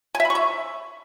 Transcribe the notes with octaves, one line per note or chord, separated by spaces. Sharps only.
G#5
E5
B5
C#6
E5